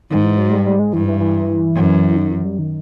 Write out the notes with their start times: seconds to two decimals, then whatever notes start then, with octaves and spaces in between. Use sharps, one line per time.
0.10 G#2 D#3
0.24 E3
0.38 F#3
0.51 G3
0.65 G3
0.79 G#3
0.93 G2 E3
1.07 E3
1.20 E3
1.75 F#2
2.17 D#3
2.31 E3
2.44 G3
2.59 D#3